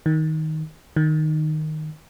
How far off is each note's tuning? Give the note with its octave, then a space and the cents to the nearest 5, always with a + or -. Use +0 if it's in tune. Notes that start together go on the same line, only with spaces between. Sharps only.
D#3 +10
D#3 -10